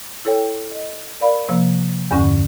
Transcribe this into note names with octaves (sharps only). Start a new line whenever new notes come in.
E4 A4 C#5 G5
D#5
A#4 D5 F5 B5
C3 F3 A#3
E2 G2 D3 C#4 F#5 C#6